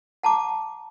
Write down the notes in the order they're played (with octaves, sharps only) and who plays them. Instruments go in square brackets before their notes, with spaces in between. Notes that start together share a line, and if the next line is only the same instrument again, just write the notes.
[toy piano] F#5 A5 A#5 D6